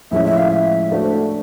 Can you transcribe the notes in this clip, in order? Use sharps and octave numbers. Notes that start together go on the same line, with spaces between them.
A2 F3 G#3 C#4 E5
E5
F5
E5
A3 D4 F#4 C5